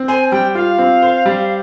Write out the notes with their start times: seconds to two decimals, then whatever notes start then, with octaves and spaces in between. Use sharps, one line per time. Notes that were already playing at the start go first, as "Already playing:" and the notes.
Already playing: C4
0.08 C5 G#5
0.32 G3 G5
0.55 F4 F5
0.78 C4
1.02 C5
1.26 G3